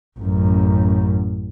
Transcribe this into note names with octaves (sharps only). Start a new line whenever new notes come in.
A1 F#2